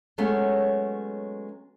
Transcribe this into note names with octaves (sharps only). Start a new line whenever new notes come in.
F#3 G#3 A3 B3 C#4